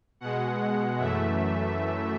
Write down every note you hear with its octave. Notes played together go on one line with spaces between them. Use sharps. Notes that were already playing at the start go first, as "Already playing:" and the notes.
B2 G#3 F#5
F#2 E3 A3 E5